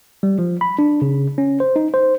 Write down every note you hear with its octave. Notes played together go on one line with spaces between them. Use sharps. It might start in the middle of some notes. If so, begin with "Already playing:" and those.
G3
F3
B5
D4
C#3
C#4
C5
D#4
C5